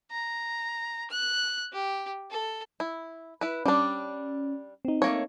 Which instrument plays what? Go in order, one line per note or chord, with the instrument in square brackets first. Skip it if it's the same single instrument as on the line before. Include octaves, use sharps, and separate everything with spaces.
[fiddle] A#5
F#6
G4
A4
[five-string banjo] E4
E4 B4
[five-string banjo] G3 D4 [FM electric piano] C#4
[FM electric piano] C4 D#4
[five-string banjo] A3 A#3 C#5